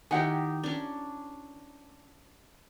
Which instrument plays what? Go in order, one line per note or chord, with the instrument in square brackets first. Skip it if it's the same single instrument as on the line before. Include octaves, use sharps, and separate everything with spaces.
[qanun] D#3 D#4 G4 [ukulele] E4 F#5 G#5
[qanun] C#4 D4